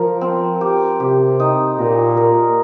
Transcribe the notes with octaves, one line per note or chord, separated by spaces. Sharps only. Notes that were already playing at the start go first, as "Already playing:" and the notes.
Already playing: F3 A#4
C4
G4
C3 G4
D#4
A#2 A#4
A#4